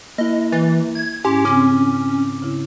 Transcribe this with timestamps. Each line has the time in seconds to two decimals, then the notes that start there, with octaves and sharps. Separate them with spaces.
0.18 A#3 E4 D#5
0.52 E3 A6
0.95 G#6
1.25 G#2 C#4 E4 G4 G#5 C6
1.45 C#3 C4 C#4 D6
2.42 C#3 E4